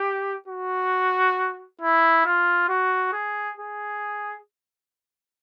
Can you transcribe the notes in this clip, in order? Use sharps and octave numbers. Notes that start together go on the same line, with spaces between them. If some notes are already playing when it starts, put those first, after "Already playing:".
Already playing: G4
F#4
E4
F4
F#4
G#4
G#4